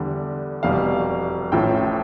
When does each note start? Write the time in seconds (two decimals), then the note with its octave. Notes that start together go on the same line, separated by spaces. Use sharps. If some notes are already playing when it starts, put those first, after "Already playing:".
Already playing: E2 D3 G3
0.63 F1 E2 B2 G3 F5
1.52 A1 A2 F3 G5